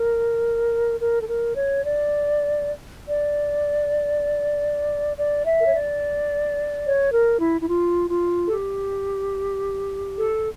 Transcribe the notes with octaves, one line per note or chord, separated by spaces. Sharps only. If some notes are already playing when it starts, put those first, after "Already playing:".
Already playing: A#4
A#4
A4
A#4
C#5
D5
D5
D5
E5
A#4
C#5
D5
C#5
A#4
E4
E4
F4
F4
A4
G4
A4